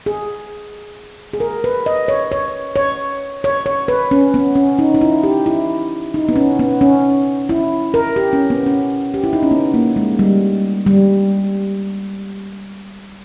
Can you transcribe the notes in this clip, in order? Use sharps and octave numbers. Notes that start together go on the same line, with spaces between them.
G#4
G#4
A#4
B4
D#5
C#5
C#5
C#5
C#5
C#5
B4
C#4
B3
C#4
D#4
D#4
E4
G4
E4
D#4
B3
C#4
B3
C#4
E4
A#4
G4
C#4
B3
C#4
G4
E4
D#4
C#4
B3
A#3
G#3
G3
G3